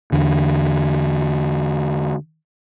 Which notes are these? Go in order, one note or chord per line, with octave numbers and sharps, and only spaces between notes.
E2 D3